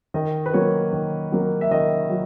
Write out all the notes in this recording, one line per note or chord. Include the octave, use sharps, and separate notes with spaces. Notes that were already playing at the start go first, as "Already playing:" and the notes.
D#3 D#5
B4
F#3 A#3 C#5
D#3
F#3 A#3
E5
D#3 D#5
F#3